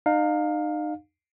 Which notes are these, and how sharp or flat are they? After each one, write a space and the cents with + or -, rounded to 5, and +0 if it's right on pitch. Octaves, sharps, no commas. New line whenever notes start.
D#4 -35 F5 +20